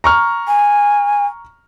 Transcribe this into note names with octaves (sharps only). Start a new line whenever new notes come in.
A#5 C#6 F6
G#5